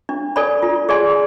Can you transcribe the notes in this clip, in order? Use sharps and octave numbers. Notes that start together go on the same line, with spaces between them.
D4
A4 D5 G#5 B5
F4
G#4 D5 G#5 C6